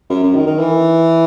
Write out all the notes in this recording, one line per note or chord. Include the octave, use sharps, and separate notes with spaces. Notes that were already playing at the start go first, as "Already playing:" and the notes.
F#2
F#2
D#3
D#3
E3